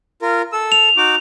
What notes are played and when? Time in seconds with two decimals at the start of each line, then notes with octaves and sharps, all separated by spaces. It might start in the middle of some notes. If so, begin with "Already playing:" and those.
0.22 F4 A#4
0.53 A4 E6
0.72 F7
0.97 D#4 F#4 D6